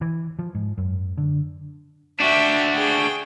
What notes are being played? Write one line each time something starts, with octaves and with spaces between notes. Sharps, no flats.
E3
F3
G#2
F#2
D3
D4 F#4 E5 G5
G#4 G5